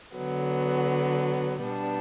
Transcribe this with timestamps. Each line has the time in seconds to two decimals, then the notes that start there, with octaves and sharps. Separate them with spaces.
0.15 D3 F#3 B3
1.63 B2 G3 B3 D4